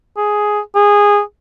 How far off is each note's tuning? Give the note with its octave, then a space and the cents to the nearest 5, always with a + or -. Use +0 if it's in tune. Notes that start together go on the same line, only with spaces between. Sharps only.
G#4 +5
G#4 -15